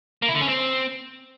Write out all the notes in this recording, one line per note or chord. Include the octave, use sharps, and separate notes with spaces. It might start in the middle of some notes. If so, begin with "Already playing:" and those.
A#3
E4
D3
C#4
C4